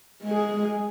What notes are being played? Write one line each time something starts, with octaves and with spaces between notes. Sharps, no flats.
G#3 G#4